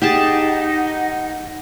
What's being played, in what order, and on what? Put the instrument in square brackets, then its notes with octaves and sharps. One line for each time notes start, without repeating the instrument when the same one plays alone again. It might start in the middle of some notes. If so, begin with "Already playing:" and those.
[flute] D#4 [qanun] G4 G#4 A5 [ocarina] F#5